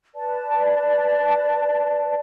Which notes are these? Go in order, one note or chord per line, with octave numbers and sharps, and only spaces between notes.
B4 D5 A5